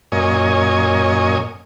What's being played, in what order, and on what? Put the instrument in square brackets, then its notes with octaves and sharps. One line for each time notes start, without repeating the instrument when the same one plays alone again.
[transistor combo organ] F#2 A#2 C#5 D#5 G#5